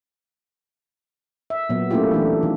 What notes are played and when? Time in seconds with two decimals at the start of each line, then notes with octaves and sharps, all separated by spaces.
1.50 E5
1.69 A#2 F#3 B3
1.91 A3 A#3 C#4 E4 F4 G4
2.11 E3 A3 D4
2.43 D#3